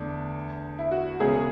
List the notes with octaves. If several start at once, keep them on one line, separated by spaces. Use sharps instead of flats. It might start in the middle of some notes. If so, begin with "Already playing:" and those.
Already playing: E2 D3 A3 D4
E4
F#4
E1 E2 C#3 G#3 C#4 G#4